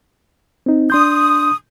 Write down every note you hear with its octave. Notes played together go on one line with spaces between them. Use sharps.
C4 D#4
D4 C6 D#6 G6